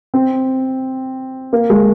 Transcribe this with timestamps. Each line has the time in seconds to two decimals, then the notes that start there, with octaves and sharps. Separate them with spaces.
0.14 C4
1.53 A#3
1.70 G#3